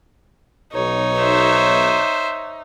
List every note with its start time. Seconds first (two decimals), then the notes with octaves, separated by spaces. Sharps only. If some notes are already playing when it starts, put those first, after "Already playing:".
0.73 B1 D#4 C#5
1.19 C5 E5